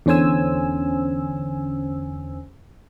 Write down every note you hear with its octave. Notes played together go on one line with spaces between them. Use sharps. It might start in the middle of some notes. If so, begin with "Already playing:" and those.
E2 D3 C#4 C5 G#5 E6